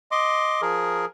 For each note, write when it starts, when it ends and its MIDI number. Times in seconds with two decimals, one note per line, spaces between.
0.11 0.61 75
0.11 0.61 84
0.11 0.61 86
0.62 1.05 53
0.62 1.05 68
0.62 1.05 70